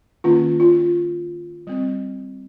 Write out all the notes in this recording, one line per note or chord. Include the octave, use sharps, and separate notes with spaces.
D#3 A#3 C#4 F4
F4
G3 C4